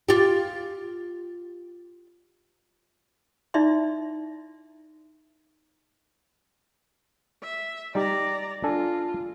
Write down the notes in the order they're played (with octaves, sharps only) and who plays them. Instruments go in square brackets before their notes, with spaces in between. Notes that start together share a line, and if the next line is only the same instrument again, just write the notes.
[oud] F4 G4
[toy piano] D#4 E4 D5 E5 C6
[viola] E5
[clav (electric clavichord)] G3 D#4 G4 [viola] D5 A#5
[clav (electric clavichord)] D4 A4 G#5 [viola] F4